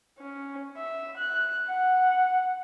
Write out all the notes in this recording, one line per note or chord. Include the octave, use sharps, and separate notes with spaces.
C#4
E5
F#6
F#5